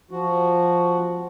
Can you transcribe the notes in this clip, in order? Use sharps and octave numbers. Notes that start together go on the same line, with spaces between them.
F3 F#4